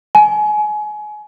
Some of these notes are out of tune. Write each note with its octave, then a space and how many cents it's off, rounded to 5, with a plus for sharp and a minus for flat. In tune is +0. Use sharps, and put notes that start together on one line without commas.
G#5 +25